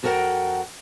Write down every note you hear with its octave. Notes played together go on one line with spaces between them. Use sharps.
F2 F#4 A4 A#4 F#5 G5